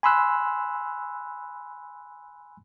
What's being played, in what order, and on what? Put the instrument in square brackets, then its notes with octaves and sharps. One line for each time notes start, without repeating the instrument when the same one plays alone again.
[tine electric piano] G#5 B5 C6 E6 F#6